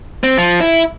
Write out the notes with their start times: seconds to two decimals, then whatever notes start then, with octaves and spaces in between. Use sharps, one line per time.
0.24 C4
0.38 F3
0.61 E4